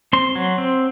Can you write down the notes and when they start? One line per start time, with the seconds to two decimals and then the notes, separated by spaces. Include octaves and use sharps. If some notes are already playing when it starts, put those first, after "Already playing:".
0.13 C4 C6
0.35 F#3
0.58 C4